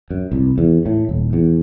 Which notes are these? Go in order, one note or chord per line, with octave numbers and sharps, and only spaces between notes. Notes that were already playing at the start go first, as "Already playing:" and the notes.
F#2
C2
E2
A2
D#1
E2